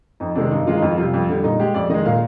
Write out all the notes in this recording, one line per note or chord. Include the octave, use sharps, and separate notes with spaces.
F2 D#4
C3 D#3 G#3 D4
G2 D#4
D#3 G#3 F4
D#4
F2 F4
C3 G3 F4
F2
D3 G3
A#2 D#4
G#3 G4
F2 D5
D#3 G#3 D#5
A#2 F5